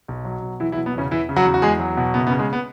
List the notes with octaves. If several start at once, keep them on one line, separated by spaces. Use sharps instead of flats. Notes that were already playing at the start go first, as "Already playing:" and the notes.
B1
F#3
B2
E3 F#3 E4
E3 E4
B2
B3
E2 C#3 C#4
E3 E4
C#3
F#3 F#4
E2
F#4
E2 G#3 G#4
F#3
B2
F#1 B3
B3
C#3
G#3
B3